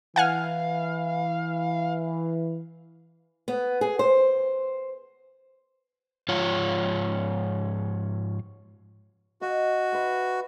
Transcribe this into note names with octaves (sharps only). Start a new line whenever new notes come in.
E3 F5 F#5 G#5 F6
B3
G#4
C5
G#2 F3 F4 C#5
F#4 D#5 F5
B4 E5 C6